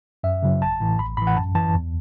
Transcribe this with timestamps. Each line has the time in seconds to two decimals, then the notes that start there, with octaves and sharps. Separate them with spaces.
0.24 F#2 E5
0.43 C#3 F#3
0.61 A1 A5
0.80 A2 E3
0.99 A1 B5
1.17 A2 E3 B5
1.27 F#5
1.37 F#2 A5
1.55 E3 A5
1.75 E2